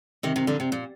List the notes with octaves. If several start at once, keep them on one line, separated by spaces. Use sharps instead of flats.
C3 D#3
C3 D#3
A#2 D3
C3
A#2